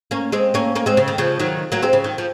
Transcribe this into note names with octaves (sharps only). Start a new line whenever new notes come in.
A#3 C#4
G#3 C4
A#3 C#4
A#3 C#4
G#3 C4
C#3
D#3
C#3 F3
D#3 F#3
F#3 A#3
G#3 C4
C#3
D#3
F3